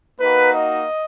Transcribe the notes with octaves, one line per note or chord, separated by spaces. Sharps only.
A#3 D#4 F#4 B4
D#5